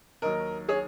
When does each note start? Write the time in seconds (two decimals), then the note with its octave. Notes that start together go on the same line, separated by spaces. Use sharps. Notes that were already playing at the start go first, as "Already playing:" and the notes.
0.22 D#2 D#3 F#3 A#4 D#5
0.68 G#4 C#5